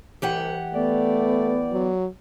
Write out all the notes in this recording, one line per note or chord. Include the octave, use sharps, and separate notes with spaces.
C2 E3 G4 F#5
A3 B3 D5
F#3